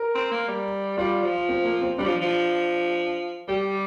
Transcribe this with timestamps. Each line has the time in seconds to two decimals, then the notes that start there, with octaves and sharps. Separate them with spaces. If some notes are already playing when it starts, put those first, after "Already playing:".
Already playing: A#4
0.15 C4
0.31 A#3
0.48 G3
0.98 G3 F4
1.23 F3
1.49 C4
1.64 A#3
1.81 C4
1.98 G3 D4
2.06 F3
2.22 F3
3.48 G3 G4